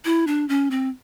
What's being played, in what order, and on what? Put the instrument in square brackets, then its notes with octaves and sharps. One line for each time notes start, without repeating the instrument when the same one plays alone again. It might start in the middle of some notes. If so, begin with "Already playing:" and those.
[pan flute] E4
D4
C#4
C4